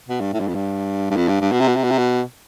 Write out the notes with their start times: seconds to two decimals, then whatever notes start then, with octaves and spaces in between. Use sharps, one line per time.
0.09 B2
0.21 G2
0.33 A2
0.40 G2
0.48 F2
0.55 G2
1.11 G2
1.16 F2
1.28 G2
1.41 G2
1.52 B2
1.60 C3
1.68 B2
1.76 C3
1.84 B2
1.91 C3
1.98 B2